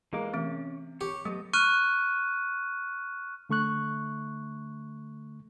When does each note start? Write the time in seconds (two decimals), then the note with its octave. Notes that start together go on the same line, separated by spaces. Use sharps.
0.13 E3 G#3 A#3 A#4 D6
0.34 C3 E3 A3 C#4
1.01 G4 C#5
1.25 F#3 A3 B3 D#5
1.53 C#6 F6 F#6 D#7
3.49 D3 A3 C#6 F#6